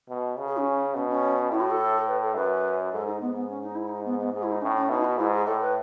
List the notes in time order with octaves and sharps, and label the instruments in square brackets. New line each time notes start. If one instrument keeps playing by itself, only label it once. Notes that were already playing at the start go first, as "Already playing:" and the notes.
[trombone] B2
C#3
[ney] G#4
C#4
[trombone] B2 [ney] C#4
[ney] C#4
[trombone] A2 [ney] E4
[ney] F#4
A4
B4
A4
[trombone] F#2 [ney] B4
[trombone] G#2 [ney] A4
[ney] D#4
[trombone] G#2 [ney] B3
[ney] B3
C#4
D#4
E4
D#4
B3
B3
[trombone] G#2 [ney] G#4
[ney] E4
D#4
[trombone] A2 [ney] C#4
[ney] C#4
[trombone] B2 [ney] D#4
[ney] E4
F#4
[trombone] G#2 [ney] E4
[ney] G#4
[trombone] A2 [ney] A4
[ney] B4